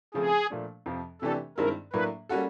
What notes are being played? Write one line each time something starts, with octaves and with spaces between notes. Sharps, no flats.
C#3 F3 A3 C4 G#4
A#2 F3 A3 D4
F2 C3 F3
C3 E3 A3 D4 G4 A4
G2 D#3 G#3 C4 E4 A#4
A2 F#3 A#3 D4 B4
G3 A#3 C#4 F#4 A4